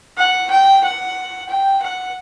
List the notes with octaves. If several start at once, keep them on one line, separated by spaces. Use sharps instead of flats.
F#5
G5
F#5
G5
F#5